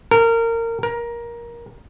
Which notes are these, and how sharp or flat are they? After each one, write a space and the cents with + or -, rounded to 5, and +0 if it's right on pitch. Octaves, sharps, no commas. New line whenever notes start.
A#4 -25
A#4 +15